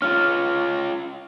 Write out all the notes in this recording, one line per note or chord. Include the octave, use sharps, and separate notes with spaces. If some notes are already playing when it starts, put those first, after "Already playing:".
C#4 F4 F6